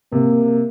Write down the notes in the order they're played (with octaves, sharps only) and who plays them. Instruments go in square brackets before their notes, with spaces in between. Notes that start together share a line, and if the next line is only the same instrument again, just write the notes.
[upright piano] C3 [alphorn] A#3